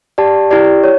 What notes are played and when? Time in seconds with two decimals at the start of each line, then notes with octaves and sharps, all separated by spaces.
0.18 G4 D5 A5
0.51 E4 G4 D5
0.84 C#5